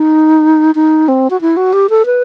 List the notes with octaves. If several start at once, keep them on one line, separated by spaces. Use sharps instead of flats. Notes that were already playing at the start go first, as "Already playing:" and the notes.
Already playing: D#4
D#4
C4
F#4
E4
F#4
G4
A4
B4